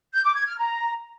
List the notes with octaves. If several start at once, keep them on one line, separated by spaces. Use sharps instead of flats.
G6
D6
G#6
F6
A#5